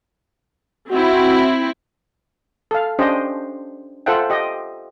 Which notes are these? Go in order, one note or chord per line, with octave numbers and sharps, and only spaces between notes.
C4 E4 F#4
A4 F5
C#4 D4 G4 C5 D#5
F4 A4 C5 E5 F#5 G5
G4 D#5